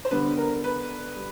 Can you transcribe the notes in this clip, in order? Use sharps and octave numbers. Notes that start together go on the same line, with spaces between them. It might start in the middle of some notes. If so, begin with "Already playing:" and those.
C5
D3 G3 B3 D4 B4
A#4
B4
G3